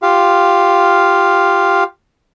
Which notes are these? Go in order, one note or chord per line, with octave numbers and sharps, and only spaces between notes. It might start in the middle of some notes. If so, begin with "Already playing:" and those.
F4 G4 F5